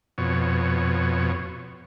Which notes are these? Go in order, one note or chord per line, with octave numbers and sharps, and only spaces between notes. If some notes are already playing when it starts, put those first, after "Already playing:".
F2 B2 C#5